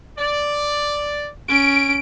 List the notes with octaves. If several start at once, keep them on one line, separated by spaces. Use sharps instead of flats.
D5
C#4 D7